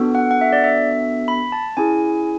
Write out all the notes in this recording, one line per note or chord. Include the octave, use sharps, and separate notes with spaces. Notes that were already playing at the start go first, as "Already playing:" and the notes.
Already playing: B3 D4 F#4 A4
F#5
F#5
E5
D5
E5
B5
A5
C#4 E4 G#4 G#5